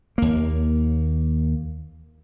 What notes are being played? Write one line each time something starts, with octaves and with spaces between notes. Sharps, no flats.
D#2 A#3